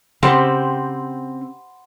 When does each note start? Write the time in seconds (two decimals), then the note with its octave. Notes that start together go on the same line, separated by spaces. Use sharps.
0.23 C#3 C4 G4 C5 F#5 B5 C6